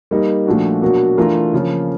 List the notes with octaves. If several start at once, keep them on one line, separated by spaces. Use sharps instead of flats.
G3 A#3 D#4
A#2 F3 A3 D4 F#4
B2 F#3 A#3 D4 F#4
E3 A3 D4 F4 A#4
C#3 F3 A#3